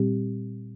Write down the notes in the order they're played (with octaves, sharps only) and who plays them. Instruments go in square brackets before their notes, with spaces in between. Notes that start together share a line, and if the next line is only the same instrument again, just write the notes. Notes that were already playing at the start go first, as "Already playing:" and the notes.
Already playing: [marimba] A#2 G3 C4 G4